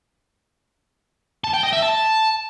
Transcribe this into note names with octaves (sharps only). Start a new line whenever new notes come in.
A5
G5
D#5
E5
A5